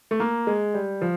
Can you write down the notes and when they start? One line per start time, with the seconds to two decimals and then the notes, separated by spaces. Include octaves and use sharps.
0.11 A3
0.20 A#3
0.47 G#3
0.74 G3
1.01 F3